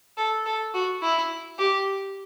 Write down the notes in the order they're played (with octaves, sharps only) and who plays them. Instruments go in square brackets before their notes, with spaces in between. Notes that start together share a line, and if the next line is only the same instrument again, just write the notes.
[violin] A4
A4
F#4
E4
G4